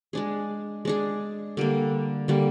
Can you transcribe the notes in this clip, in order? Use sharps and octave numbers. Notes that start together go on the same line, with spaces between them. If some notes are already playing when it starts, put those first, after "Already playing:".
G#3 D4 G#4
G#3 D4 G#4
D3 G3 A#3
D3 G3 A#3